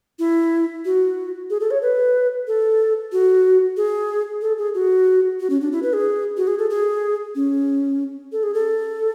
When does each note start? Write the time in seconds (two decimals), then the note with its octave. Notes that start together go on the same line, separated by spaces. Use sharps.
0.19 E4
0.85 F#4
1.50 G#4
1.60 A4
1.71 C#5
1.82 B4
2.47 A4
3.12 F#4
3.77 G#4
4.42 A4
4.58 G#4
4.75 F#4
5.40 F#4
5.50 C#4
5.61 D4
5.72 E4
5.83 B4
5.93 G#4
6.37 F#4
6.47 G#4
6.59 A4
6.70 G#4
7.35 C#4
8.32 A4
8.43 G#4
8.54 A4